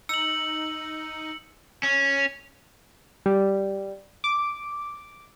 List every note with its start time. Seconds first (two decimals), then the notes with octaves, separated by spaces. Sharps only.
0.09 D#4 E6 C#7 F#7
1.83 C#4
3.26 G3
4.24 D6